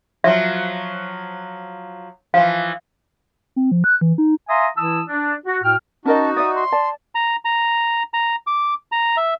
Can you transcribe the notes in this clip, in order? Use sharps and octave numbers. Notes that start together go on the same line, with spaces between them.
F3 F#3 E5
E3 F3 F5
C4
F3
F#6
E3
D#4
E5 F5 G#5 A#5 C6 D#6
E3 E4 A5 D#6 E6
D4
F#4
A2 F#4 G5 F6
C#4 D#4 F#4 A#4 D#5 A5
D5 E5 D#6
C6
D5 A5
A#5
A#5
A#5
D6
A#5
E5